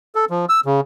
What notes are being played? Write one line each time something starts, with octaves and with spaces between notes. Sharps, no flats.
A4
F3
E6
C#3